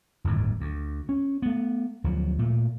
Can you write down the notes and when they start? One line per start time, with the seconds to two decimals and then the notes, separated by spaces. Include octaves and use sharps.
0.24 D1 G1 D#2 A2
0.60 D2
1.09 C#4
1.42 A3 B3
2.04 D2 F3 F#3
2.39 A#2 A3